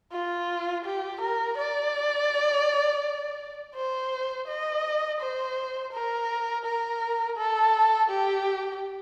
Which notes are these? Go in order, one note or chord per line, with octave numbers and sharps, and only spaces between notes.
F4
G4
A#4
D5
C5
D#5
C5
A#4
A#4
A4
G4